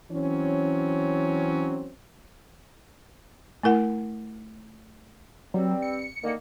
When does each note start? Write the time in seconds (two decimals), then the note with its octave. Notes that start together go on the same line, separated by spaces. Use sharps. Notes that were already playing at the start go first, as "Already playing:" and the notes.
0.10 E3 F#3 C4 C#4
3.63 A3 E4 A#4 F#5
5.54 G2 F#3 G3 C4
5.82 C#7
6.23 D3 D#3 A#3